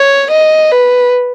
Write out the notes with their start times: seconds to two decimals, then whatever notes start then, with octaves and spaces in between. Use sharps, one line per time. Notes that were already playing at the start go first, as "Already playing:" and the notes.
Already playing: C#5
0.31 D#5
0.72 B4